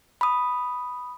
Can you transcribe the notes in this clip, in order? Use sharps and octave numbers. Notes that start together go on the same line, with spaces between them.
B5 D#6